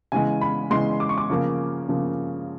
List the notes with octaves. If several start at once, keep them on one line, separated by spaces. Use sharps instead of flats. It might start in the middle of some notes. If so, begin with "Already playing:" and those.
C#3 E3 G#3 G#5
B5
C#3 E3 G#3 C6
D6
C#6
D6
C#3 F3 A#3
C#3 F3 A#3